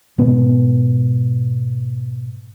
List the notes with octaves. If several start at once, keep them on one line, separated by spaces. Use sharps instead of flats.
G#2 B2 B3